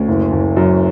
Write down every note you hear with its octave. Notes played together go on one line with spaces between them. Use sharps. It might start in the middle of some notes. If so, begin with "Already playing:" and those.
Already playing: D2 C#4
F#1
F#1
F#2